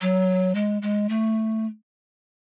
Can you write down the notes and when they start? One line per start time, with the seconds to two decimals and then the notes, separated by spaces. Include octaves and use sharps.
0.01 F#3
0.55 G#3
0.82 G#3
1.09 A3